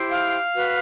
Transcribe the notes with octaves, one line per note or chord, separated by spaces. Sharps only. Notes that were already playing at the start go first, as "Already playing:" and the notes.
Already playing: E4 G4 C5
F5
F#4 B4